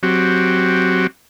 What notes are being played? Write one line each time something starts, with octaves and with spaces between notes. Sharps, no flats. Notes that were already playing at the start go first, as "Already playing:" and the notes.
F#3 C4 F#4 G4